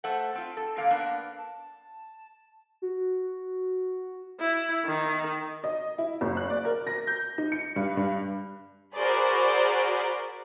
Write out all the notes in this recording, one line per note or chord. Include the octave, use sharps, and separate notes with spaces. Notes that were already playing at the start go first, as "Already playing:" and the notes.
A3 A4 C5 F#5
C4 F4
A4
A#2 D3 A#3 F5
A#3 B3 D4
A5
F#4
E4
D#3
D#5
E4
F#1
F#6
D5
A#4
A#6
G6
D#4
C#7
G2
G2
F#4 G#4 A#4 C5 D5 B5